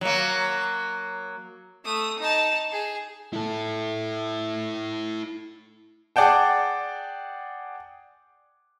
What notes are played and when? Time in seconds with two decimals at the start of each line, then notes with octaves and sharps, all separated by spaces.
0.01 F#3 A#3
1.84 A3 D#6
2.19 D#4 A5
2.72 G#4
3.33 E4 A4
6.16 G#4 D5 F#5 G5 A5